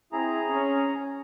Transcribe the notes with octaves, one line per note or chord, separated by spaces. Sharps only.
C4 E4 G#4 A#5
C#4